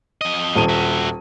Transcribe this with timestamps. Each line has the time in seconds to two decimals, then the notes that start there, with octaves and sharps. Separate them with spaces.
0.21 F2 D#5
0.55 D#1 D#7
0.69 F#4 E5